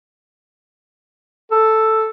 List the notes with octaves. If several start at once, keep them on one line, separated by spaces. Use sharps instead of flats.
A4